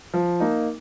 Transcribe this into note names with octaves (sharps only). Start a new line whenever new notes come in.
F3
A#3 D#4